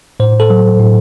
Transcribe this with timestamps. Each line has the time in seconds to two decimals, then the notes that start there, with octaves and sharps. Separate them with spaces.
0.20 A2 C5
0.40 A4
0.50 F#3
0.80 A2